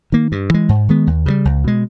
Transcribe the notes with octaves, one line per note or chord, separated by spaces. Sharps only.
D#3 A#3
G2
E3 G#3
G#2
D#3 G#3 B3
D#2
C#3 E3 G3
C#2
B2 G#3